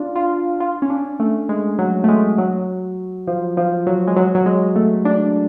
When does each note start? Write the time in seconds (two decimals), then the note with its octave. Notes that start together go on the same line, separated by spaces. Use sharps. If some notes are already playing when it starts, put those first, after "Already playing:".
Already playing: D4 F4
0.16 F4
0.60 F4
0.82 C#4
0.90 D4
1.20 A3
1.49 G#3
1.79 F#3
2.04 A3
2.08 G#3
2.38 F#3
3.27 F3
3.57 F3
3.87 F#3
4.07 G#3
4.16 F#3
4.35 F#3
4.46 G#3
4.76 A3
5.05 D4